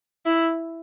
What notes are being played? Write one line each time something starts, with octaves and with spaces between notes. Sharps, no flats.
E4